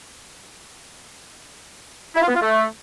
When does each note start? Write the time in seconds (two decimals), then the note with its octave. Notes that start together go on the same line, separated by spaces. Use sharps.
2.15 E4
2.22 F4
2.28 B3
2.35 F4
2.41 A3